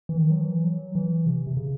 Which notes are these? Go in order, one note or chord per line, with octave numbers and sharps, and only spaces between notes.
E3
D#3
F#3
E3
F#3
E3
C3
C3
C#3